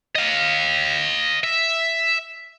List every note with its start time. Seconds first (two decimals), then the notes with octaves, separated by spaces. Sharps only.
0.15 D#5 F5
1.44 E5